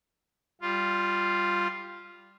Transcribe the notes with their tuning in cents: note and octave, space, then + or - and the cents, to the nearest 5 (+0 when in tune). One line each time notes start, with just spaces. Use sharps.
G3 +0 F4 +0